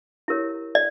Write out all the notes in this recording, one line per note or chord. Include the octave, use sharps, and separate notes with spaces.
E4 G4 A#4 C#5
D5